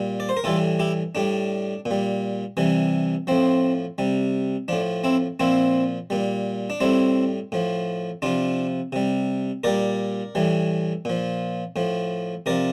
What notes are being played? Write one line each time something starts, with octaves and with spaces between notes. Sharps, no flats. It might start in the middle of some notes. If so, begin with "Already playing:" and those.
Already playing: A#2 G3
D5
C5
A#4
A2 E3 G3 F4 A4
E4 G4
A2 G3 D4
A#2
G3
C3 E3 G3
A2 F3 C4
C3 G3
A2 F3 D4
C4 E4
A#2 F3 C4 E4
A#2 G3
D4
A2 G3 C4 E4
A2 F3
C3 F3 D4 F4
C3 G3
A#2 G3 A#4 D5
A2 E3 G3
A#2 F3
A2 F3
C3 F3 A#4 D5